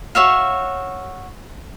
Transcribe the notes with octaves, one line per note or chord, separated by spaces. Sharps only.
F#4 C#5 E5 F5